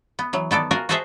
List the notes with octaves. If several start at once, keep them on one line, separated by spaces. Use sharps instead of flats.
B3
E3 F#3
D#3 B3 A4 D5
F4 F#4 A#4 G#5
F#4 G#4 A4 C5 D#5 E5